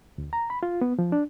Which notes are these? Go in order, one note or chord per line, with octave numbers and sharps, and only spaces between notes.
D2
A#5
B5
F4
B3
F3
D4